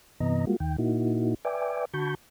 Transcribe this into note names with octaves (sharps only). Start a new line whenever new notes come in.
G2 C3 E3 B3 D#5 A#5
G3 G#3 A#3 F4 F#4
D#2 D#3 G5
A#2 A#3 D#4 E4 F#4
B4 D5 E5 G5 G#5 D6
D3 F#4 A5 B5 C#6 G6